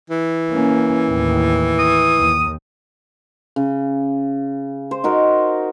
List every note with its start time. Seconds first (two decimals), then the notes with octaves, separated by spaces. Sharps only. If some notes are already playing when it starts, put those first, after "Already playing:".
0.10 E3
0.51 A#3 C#4
1.08 D#2 A2
1.79 D#6
2.19 D#2
3.56 C#3
4.91 C5
5.04 D#4 F#4 A#4